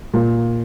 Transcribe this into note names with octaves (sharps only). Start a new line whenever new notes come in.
A#2